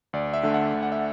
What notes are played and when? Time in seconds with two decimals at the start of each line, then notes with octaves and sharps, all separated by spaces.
0.13 D2 D5
0.34 E5
0.43 D3 A3
0.54 F#5
0.74 D2
0.83 F#5
0.92 E5